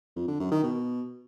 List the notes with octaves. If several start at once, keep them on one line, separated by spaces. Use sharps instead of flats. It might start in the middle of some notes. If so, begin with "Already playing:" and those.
F2
D3
F#2
D#3
B2